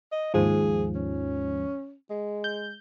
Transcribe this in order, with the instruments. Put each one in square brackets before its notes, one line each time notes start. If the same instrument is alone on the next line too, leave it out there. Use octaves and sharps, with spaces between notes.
[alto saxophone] D#5
[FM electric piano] D#2 G#2 F3 [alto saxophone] G#4
[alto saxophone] C#4
G#3
[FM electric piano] G6